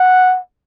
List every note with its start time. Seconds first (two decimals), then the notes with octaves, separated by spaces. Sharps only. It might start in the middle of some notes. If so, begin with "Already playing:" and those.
Already playing: F#5